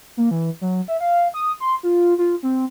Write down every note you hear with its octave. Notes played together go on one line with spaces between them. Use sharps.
A#3
E3
F#3
E5
F5
D#6
C6
F4
F4
C4